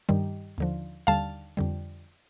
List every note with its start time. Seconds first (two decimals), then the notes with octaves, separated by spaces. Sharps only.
0.09 G2 D#3 G3
0.58 D#2 D3 F3
1.07 D#2 D3 G3 F5 A5
1.57 F2 D3 G3